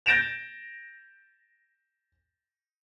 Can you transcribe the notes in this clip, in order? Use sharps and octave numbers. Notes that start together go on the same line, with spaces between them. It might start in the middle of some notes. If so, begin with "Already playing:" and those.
G6 A6 A#6 D7 E7 F7